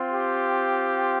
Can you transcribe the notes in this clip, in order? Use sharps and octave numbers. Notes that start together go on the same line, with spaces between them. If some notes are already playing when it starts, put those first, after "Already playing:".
Already playing: C4 F4
G4